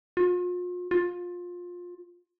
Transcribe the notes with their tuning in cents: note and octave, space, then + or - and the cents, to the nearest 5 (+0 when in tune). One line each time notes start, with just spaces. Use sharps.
F4 +40
F4 +20